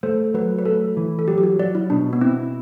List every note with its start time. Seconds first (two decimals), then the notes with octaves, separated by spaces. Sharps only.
0.03 A3 C5
0.34 F#3 B4
0.59 B4
0.65 A3 A4
0.97 E3
1.19 A4
1.28 F#3 G4
1.38 G4
1.43 F#4
1.59 F#3 D5
1.75 E4
1.90 B2 D4
2.13 B3
2.21 C4 E4